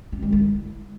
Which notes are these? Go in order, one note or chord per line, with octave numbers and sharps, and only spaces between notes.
C4
G#3
E4